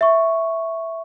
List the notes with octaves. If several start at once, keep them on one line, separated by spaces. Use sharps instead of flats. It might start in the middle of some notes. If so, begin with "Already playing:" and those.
E5 C#6